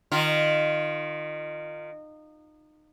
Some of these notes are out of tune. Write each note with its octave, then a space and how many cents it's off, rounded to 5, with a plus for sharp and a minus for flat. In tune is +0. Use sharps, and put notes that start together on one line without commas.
D#3 -25 F4 +0